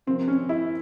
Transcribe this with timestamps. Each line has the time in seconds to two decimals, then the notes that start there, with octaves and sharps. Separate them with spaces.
0.07 C3 F3 A#3 C4
0.28 C#4
0.49 E4